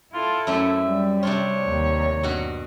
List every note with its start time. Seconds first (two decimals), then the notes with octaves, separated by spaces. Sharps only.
0.13 E4 F4 A4
0.47 F#2 A3 C4 E5
0.85 G3
1.23 C3 D4 F4 C#5
1.67 D#2
2.23 G2 B2 F#4